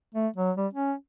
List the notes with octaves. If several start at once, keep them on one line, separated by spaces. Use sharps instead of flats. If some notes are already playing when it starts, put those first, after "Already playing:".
A3
F#3
G3
C#4